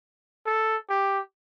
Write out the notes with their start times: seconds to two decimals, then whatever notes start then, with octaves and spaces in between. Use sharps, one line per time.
0.46 A4
0.89 G4